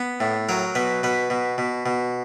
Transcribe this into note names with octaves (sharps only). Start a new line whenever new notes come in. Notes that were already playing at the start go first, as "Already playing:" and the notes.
Already playing: B3
A2
F#3 A#4
B2 B4
B2 B4
B2
B2
B2